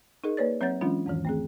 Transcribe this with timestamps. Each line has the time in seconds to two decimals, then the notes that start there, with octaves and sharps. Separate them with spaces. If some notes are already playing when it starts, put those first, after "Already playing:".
0.24 D#4 G#4 A#4 D#5
0.37 A#3 B4 C#5 D5 A6
0.61 F#3 C4 C#5 F#5 G6 A6
0.81 E3 F#3 G#3 C#4 D4 F4
1.06 E2 G#2 D#3 E3
1.25 A3 C4 G#4